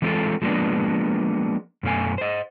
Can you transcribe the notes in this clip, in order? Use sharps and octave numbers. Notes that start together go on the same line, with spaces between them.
E3 G#3 C4 F4 A4
F3 G#3 A#3 B3 D4
F#2 B2 A3 F5 G#5
C5 D#5